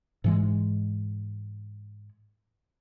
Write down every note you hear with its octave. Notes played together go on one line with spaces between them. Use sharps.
G#2 E3 G#3